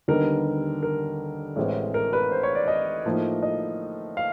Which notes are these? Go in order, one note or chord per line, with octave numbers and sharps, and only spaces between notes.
D#2 D3 G3 B3 D#4 A#4
A#4
A1 A2 E3 G#3 C4
A#4
B4
C5
C#5
D5
D#5
A2 F3 A#3 D#4
D#5
F5